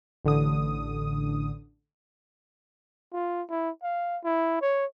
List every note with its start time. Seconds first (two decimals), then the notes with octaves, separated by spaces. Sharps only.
0.25 A1 D3 D#6
3.13 F4
3.50 E4
3.83 F5
4.24 E4
4.62 C#5